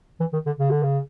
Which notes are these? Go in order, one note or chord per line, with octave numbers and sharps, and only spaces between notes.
E3
D#3
D3
C#3
D3
C#3